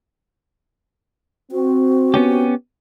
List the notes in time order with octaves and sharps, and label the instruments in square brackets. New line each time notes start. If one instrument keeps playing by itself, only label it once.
[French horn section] C4 [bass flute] F#4
[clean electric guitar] B3 C#4 G4